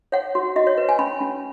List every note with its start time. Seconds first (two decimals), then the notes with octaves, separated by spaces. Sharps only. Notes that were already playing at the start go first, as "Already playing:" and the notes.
0.12 C#5 F#5
0.35 F#4
0.56 F#4 D#5
0.67 C#5
0.77 B4
0.89 G#5
0.99 C#4 B5
1.21 C#4